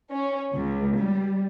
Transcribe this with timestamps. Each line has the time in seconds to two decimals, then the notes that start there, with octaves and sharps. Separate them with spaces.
0.13 C#4
0.53 C#2
0.98 G3